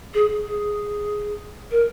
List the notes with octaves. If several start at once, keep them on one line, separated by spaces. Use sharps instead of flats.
G#4
G#4
A#4